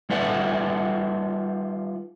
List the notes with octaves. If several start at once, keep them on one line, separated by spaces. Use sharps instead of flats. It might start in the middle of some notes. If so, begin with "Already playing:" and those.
G3 D#4 F4 B4 E5 F#5